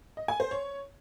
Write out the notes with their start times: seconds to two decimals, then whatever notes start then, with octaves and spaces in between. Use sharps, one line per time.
0.17 D#5
0.28 G#5
0.40 C5
0.51 C#5